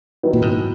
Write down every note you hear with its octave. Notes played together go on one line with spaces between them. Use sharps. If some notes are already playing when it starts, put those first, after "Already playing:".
D#3 F#3 B3 E4
A#2
G#2